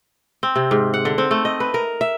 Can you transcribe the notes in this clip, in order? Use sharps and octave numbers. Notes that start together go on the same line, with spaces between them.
C4
C3
G#2
F#5
D3
C4
A3
D#5
B4
A#4
E5